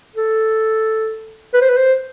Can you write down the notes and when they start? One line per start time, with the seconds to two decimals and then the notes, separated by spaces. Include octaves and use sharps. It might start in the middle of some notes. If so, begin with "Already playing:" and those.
0.16 A4
1.54 B4
1.61 C5
1.69 B4
1.77 C5